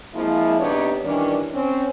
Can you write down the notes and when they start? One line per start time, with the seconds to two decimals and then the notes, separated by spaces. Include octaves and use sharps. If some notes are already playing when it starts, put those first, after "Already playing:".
0.14 F3 G#3 A#3 C4 E4
0.58 C3 B3 D4 D#4 G4 C#5
1.03 D#3 E3 G3 C#4 D4
1.52 C4 C#4